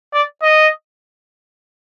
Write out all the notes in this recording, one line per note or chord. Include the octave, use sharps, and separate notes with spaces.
D5
D#5